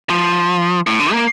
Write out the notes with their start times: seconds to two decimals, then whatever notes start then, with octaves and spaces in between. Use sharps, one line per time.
0.10 F3
0.87 A2
0.99 D3
1.12 A#3